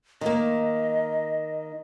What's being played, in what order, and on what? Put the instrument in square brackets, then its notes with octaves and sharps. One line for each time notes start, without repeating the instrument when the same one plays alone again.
[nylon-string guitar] D#3 A#3 [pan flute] D#5